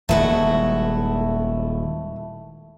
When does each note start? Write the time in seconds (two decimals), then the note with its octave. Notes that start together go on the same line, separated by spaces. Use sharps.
0.09 D#1 D#3 G#3 A3 E4 F#4